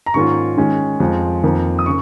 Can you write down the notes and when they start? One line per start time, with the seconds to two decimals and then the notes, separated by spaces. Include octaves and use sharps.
0.06 A#5
0.14 G#2 D#3 A#3 C#4 F4 C#6
0.57 D#3 G#3 C#4
1.00 F2 F3 G#3 F4
1.44 F2 D#3 A#3 F4
1.79 D#6
1.86 C#3 C#6